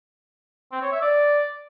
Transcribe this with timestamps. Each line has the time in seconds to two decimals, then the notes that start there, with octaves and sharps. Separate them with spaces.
0.72 C4
0.82 C#5
0.92 E5
1.02 D5